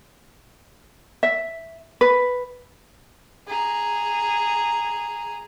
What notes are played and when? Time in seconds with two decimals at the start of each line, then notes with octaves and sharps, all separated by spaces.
1.23 E5
2.01 B4
3.47 G#4 A#5